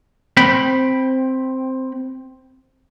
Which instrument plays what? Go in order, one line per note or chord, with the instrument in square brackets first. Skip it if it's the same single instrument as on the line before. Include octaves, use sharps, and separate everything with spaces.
[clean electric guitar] C4 G5 B5